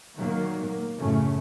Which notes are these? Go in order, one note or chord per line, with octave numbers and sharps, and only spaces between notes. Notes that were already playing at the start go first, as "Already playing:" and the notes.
A#2 D#3 F#3 A#3
A#3
F#2 A2 C#3 A3 C#4